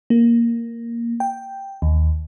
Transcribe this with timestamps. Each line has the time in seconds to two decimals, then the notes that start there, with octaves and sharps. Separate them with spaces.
0.10 A#3
1.20 G5
1.82 D#2